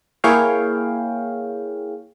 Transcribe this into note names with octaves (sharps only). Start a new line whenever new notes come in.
A#3 E4 G#4 C#5 F5 G5